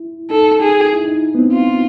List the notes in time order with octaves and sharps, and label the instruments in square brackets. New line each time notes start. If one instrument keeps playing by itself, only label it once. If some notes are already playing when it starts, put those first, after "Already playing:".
Already playing: [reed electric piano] E4
[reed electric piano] D#4 [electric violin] A4
[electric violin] G#4
[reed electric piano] E4
D#4
B3
C4
[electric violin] F4